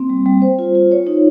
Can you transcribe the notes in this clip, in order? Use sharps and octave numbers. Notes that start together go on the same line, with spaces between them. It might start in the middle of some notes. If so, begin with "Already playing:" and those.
Already playing: A#3 C4
G3
G3
C5
F4
F4
C#5
D#4